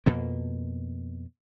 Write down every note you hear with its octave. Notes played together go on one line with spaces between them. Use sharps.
F2 B2 A#3